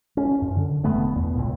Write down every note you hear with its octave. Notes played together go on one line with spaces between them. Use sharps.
C#4
F#2
D3
E1 D3 A3 B3
E2 B3
C#2 A#2